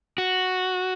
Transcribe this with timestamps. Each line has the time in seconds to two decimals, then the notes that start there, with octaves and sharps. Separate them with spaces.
0.18 F#4